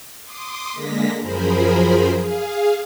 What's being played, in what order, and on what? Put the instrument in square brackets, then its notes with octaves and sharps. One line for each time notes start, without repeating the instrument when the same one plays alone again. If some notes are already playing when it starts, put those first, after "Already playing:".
[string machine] C6 D6 D#6
D3 G#3 A#3 A#6 B6
F#2 F3 G#4 A#4 C5 B5
G#4 F5